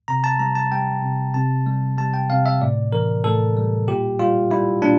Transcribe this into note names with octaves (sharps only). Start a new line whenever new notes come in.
C3 A#5
A5
G3 A#5
A5
G3 G5
C3
C3 A5
G3
G3 A5
G5
C3 F5
E5
A2 D5
E3 A#4
A2 A4
G3
A#2 G4
G3 F4
G3 E4
A#2 D4